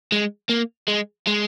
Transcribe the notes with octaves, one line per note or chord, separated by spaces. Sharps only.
G#3
A#3
G#3
G#3